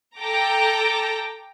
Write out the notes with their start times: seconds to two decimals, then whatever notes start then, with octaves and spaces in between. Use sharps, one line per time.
0.19 A4 G5 A#5 D6